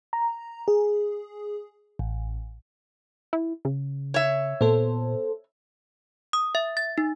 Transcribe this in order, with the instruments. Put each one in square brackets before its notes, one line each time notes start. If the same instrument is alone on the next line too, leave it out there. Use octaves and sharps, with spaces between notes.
[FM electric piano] A#5
G#4
A1
[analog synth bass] E4
C#3
[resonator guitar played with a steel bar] C#5 E5
[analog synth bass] A#2 [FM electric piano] B3 A4 C5
[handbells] D#6
E5
A6
D#4